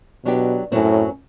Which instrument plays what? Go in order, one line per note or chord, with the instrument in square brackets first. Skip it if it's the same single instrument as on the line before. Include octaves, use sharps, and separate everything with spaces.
[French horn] B2 [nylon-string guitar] F#3 B3 D4 G4
[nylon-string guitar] F#2 F#3 C4 [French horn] A2